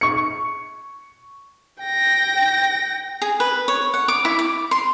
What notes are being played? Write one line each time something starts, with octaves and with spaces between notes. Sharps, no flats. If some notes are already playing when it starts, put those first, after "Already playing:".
C#6 C#7
G5 A#6
G#4
B4
C#5
F#5
D6
E4
D6
C6